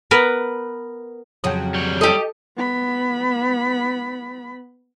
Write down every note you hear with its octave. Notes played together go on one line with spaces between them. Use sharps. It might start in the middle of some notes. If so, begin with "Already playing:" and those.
B3 A#4 B4
F2 C#3 F#3 G5 D#6
G3 C#5
G4 A4 D#5
B3 B5